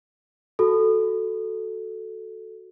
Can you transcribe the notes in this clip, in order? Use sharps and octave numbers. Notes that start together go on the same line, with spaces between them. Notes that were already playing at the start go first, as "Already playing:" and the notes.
F#4 A4